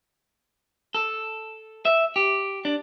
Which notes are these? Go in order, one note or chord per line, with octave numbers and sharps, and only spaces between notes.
A4
E5
G4
D4